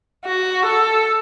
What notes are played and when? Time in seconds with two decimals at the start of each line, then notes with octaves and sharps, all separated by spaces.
0.25 F#4
0.65 A4